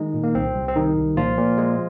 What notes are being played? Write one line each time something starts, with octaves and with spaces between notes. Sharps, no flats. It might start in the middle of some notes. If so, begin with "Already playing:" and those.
Already playing: D#3 G#3 D#4
A#2
A#3
C2 C4
C2
C4
C2 D#3 D#4
C2
A#2 F3 F4
A#2
G#3